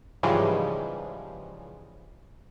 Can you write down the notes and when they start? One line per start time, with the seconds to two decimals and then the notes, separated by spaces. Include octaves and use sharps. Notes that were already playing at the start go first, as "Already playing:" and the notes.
0.23 G#2 C#3 E3 F3 G3 G#3